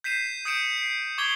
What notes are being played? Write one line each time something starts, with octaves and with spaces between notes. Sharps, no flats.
G6 B6 C7 D#7 E7
D#6 G6 C#7 D7 E7
C7
C#6 D6 G#6 G7